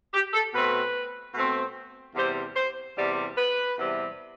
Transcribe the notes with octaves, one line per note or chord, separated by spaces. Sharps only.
G4
A4
B2 A3 C4 B4
B2 A3 C4
E2 C3 G3 C5
C5
E2 C3 G3 D5
B4
E2 C3 G3